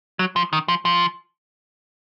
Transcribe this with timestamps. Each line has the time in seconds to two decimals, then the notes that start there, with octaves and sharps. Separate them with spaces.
0.19 F#3
0.36 F3
0.53 D#3
0.68 F3
0.85 F3